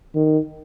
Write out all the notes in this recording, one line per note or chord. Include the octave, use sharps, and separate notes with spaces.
D#3